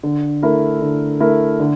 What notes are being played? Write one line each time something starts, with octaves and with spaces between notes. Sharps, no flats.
D3
A3 E4 A#4
D3
A3 E4 A#4
D3